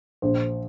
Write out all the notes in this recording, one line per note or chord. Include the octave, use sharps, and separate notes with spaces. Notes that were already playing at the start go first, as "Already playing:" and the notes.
A#1 C5